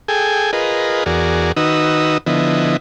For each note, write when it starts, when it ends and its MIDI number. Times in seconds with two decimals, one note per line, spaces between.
0.08 0.51 68
0.08 0.51 69
0.08 0.51 79
0.08 0.51 80
0.53 1.04 65
0.53 1.04 68
0.53 1.04 70
0.53 1.04 71
0.53 1.04 75
1.06 1.52 40
1.06 1.52 66
1.06 1.52 68
1.06 1.52 70
1.06 1.52 74
1.57 2.18 51
1.57 2.18 63
1.57 2.18 66
1.57 2.18 71
1.57 2.18 87
1.57 2.18 88
2.26 2.77 50
2.26 2.77 53
2.26 2.77 59
2.26 2.77 64
2.26 2.77 75